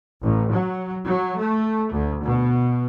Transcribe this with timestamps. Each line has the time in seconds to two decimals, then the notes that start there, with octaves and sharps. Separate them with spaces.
0.22 A1
0.53 F#3
1.05 F#3
1.38 A3
1.92 D2
2.23 B2